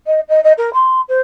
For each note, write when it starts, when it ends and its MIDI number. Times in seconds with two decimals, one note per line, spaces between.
0.06 0.20 75
0.29 0.42 75
0.44 0.52 75
0.57 0.70 70
0.73 1.01 84
1.08 1.21 72